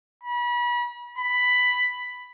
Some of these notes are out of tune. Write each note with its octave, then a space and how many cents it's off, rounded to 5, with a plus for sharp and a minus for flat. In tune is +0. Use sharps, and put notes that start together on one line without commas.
B5 -35
B5 +5